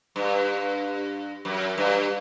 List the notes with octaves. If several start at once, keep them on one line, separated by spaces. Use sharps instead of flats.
G2
F#2
G2